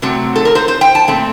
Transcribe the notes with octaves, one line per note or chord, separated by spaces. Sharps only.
C3 F#3 A3 C4
A4
A#4
C5
C5
G5
A5
A#2 A3 C4